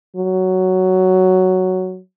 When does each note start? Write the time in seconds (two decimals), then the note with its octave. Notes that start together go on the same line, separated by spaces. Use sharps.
0.16 F#3